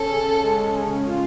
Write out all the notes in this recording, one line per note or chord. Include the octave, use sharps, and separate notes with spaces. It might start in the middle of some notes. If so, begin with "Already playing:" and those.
Already playing: C#4 A4
C#3
G#3
C#3
F4